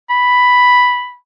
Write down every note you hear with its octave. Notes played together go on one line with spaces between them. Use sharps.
B5